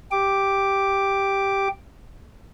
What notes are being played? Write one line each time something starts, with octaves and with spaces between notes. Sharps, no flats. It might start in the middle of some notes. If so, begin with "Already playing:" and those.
G4 D6